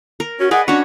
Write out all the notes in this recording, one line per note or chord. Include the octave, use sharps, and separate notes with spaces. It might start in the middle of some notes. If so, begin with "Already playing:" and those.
A#4
C#4 F#4
G#4 B4 D5 D#5 F#5
C#4 D4 F#4 C#5